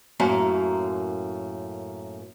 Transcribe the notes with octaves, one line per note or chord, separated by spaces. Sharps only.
F#2 A2 A#3